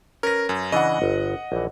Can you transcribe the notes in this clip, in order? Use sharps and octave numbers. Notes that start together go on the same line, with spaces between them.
C#4 A#4 B4 A#6
F#2
C#3 E3 D4 D#5 F#5
G1
A#1 E3